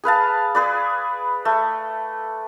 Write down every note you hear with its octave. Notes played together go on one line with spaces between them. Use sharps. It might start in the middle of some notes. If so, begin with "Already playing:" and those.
G#4 B4 F5 A5
G#4 B4 D5
A3